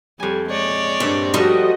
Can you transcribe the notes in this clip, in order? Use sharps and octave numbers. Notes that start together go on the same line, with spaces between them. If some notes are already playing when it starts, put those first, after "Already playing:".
F2 G3 G#5
G#3 C#5 D5
G2 A#2 C4 E5
F3 G3 A3 C4 D#4 F#4 D#5